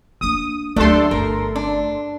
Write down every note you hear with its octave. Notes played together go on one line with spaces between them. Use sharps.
A#3 D4 D#6
D2 F#3 A3 D4 G4 A4 C6
G1 A#4
D4